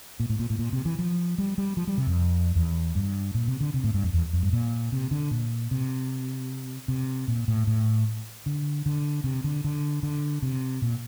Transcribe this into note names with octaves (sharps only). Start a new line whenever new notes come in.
A#2
A2
A#2
A2
A#2
C3
E3
F3
G3
G3
F3
G3
C3
F2
E2
G2
A#2
C3
D3
C3
A2
G2
F2
E2
F2
G2
A#2
C3
D3
A#2
C3
C3
A#2
A2
A2
D3
D3
C3
D3
D3
D3
C3
A#2